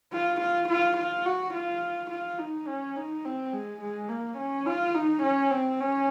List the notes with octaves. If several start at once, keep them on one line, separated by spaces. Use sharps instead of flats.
F4
F4
F4
F4
F#4
F4
F4
D#4
C#4
D#4
C4
G#3
G#3
A#3
C#4
F4
D#4
C#4
C4
C#4